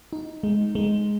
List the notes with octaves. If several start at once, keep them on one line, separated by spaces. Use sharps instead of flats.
D#4
G#3
G#3